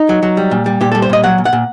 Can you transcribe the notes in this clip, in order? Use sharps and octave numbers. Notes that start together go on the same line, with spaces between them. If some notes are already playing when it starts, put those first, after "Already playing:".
Already playing: D#4
F#3
F#3
G3
A#2
G3
A#2 G4
A4
G3
C5
A#2 D#5
F#3 F#5
A#2
F#5
A#2